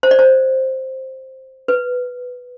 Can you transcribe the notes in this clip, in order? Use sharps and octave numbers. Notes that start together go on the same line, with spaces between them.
C5
D5
C5
B4